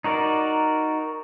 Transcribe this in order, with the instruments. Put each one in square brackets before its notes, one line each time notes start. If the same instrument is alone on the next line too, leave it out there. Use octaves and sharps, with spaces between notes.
[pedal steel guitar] D#4 F#4 A#4 D5